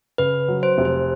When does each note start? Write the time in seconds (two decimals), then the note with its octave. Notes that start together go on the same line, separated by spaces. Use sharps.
0.18 C#3 B4
0.48 F#3
0.63 C5
0.78 F1
0.85 C5